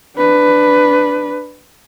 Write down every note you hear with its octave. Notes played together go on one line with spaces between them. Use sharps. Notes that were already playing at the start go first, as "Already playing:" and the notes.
D4 B4